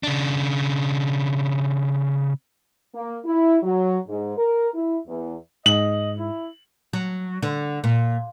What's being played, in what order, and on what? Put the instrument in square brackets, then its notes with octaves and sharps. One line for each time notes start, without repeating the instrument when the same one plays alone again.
[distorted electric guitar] C#3 D4
[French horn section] A#3
E4
F#3
G#2
A#4
E4
E2
[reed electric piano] G#2 [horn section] D#5 [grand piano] F#7
[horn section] E4
[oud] F#3
D3
A#2